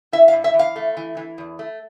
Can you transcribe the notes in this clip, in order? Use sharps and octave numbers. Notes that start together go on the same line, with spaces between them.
E4 E5
F5
G2
E5
E3
F5
A3
E3
E3
E2
A3